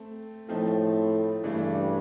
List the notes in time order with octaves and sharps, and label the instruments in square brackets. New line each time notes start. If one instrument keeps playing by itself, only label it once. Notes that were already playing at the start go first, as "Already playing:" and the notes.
Already playing: [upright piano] A3 C4
[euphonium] A2 [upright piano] F3 A3 C4 D#4
[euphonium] G2 [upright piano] C#3 E3 A3 D4